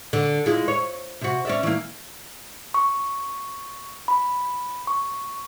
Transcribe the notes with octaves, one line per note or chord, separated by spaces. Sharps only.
D3
G#3 E4 F4
C#5
C3 F#4
C#4 D5 E5
E3 A#3
C#6
B5
C#6